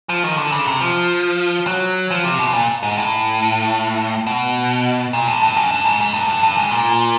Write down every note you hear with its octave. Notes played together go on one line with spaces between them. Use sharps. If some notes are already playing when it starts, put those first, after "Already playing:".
F3
D#3
D3
C#3
C3
F3
F#3
F3
C3
B2
A#2
G#2
A2
B2
A#2
A2
G2
F#2
G2
G#2
G#2
G2
G2
G2
G#2
A#2